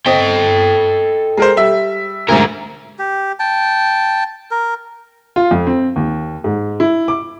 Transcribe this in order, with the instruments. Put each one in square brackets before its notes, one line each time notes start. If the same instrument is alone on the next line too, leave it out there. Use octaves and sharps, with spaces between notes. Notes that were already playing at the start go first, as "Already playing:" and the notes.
[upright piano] C4 D#5 [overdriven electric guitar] A4 G5
[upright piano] G#3 A#4 C5
G3 E5
[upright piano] D2 G#2 [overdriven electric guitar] F#4 A#4
[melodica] G4
G5 A5
A#4
[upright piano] F4
F2
C4
D#2
G#2
E4
D6